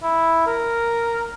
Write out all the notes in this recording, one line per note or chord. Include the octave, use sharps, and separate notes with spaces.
E4
A#4